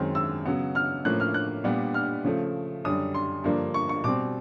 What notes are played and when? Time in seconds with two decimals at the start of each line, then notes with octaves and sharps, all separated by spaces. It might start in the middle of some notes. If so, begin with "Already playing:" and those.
Already playing: F#2 D#3 G#3 C4
0.15 E6
0.45 C#3 F#3 B3
0.75 F6
1.05 A2 F3 A#3 C#4 F#6
1.20 F6
1.34 F#6
1.64 A#2 G3 B3 D4
1.94 F6
2.25 C#3 F3 A3
2.85 F#2 D3 G3 D#6
3.14 C6
3.44 G2 D3 F3 A#3 D4
3.74 C#6
3.89 C#6
4.04 B2 G3 C4 D6